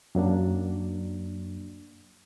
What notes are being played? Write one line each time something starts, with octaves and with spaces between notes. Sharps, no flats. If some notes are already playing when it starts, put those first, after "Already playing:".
F#2 F#3 A#3 D4